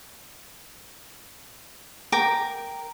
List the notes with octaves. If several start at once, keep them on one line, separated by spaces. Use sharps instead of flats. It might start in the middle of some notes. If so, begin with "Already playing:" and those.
A#4 G5 D6